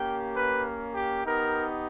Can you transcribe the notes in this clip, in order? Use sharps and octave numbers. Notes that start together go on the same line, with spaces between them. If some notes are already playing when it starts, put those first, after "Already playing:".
Already playing: A#3 C#4 G4 G5
B4
G4
B3 D#4 G4 A#4